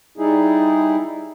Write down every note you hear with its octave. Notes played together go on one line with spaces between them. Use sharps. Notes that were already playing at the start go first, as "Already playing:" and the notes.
G3 D#4 E4 G#4